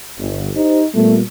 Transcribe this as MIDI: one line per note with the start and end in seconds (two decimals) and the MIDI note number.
0.18 0.49 31
0.56 0.86 63
0.56 0.79 67
0.56 0.79 72
0.94 1.21 46
0.94 1.21 55
0.94 1.16 57
0.94 1.21 59